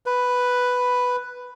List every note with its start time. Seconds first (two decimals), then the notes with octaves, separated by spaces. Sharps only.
0.06 B4